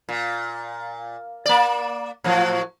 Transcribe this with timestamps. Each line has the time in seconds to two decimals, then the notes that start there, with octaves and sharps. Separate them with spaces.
0.09 A#2
1.46 A#3 D5
2.24 A2 F3 F#3